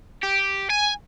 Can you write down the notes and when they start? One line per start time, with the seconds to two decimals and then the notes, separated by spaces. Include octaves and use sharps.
0.23 G4
0.70 G#5